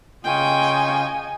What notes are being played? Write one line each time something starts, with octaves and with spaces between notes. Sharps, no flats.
C#3 F4 D#5 G5 G#5 C#6